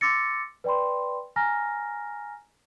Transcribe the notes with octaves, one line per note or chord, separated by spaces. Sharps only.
C6 D6 E6 A6 A#6 C#7
B4 D5 G5 B5 C6
G#5 A#5 F6 A#6